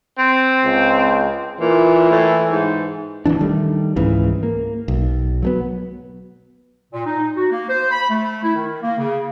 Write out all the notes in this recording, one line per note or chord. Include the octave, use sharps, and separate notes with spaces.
C4
C#2
A#2 E3
A2
G#2
D#1 C#2 E3 D4
D#3 G3 A3
C#2 G#2 C#3 E3
A#3
B1
F#3 A3 B3
A#2
D#4
F#4
A#3
C5
B5
A3
E4
D#3
A#3
C#3